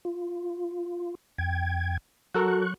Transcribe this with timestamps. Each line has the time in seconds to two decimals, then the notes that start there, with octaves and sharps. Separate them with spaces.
0.05 F4
1.38 F2 G5 G#6
2.34 F#3 F#4 A4 A#4 C#6 F#6